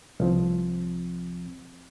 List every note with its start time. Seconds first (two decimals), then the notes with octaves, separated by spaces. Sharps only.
0.20 C2 F3 C4